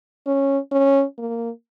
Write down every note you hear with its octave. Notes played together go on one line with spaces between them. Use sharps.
C#4
C#4
A#3